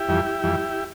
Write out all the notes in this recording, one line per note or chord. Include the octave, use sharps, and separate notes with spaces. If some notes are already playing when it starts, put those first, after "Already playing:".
Already playing: E4 G4
F2 E3 G3
F2 E3 G3